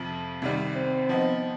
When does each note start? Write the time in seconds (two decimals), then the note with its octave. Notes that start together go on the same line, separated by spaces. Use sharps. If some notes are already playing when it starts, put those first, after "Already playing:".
Already playing: F2 C3 F3
0.42 C2 C3 D#3 G3
0.75 C4
1.09 F3 B3 D#4